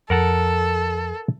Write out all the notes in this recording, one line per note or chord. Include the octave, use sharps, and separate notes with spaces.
F2 A4 A#4 F#5 A5